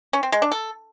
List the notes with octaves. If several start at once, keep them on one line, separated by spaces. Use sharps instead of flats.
C#4
C4
G#3
D4
A4